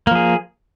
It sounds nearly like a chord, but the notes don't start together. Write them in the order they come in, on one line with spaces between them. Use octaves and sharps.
A#3 F3 G#4